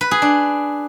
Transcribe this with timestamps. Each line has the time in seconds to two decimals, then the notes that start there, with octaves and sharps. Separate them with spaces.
0.01 B4
0.11 G#4
0.22 D4